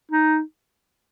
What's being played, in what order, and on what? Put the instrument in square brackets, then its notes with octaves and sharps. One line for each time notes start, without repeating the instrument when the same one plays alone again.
[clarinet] D#4